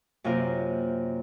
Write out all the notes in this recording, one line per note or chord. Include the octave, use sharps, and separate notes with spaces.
F#2 C3 A#3 F4 A#4